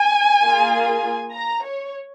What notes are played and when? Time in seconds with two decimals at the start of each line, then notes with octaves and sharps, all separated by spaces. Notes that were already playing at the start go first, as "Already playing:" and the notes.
Already playing: G#5
0.44 A#3 F4 G#4
1.34 A#5
1.64 C#5